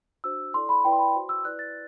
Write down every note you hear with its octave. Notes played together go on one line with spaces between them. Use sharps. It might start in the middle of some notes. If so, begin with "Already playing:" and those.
D4 F#4 C5 E6
E4 A4 D5 C6
B5
E4 B4 D5 G5
C6
B5
F#4 C5 C6
E6
E4 B4 D5 F#6
A6